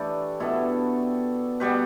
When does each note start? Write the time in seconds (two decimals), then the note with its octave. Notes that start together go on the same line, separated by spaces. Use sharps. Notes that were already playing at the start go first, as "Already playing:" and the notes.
Already playing: E3 A3 D4 G4 A4 B4 D5
0.40 B2 B3 D4 E4 A4
1.60 B2 G3 B3 G4 B4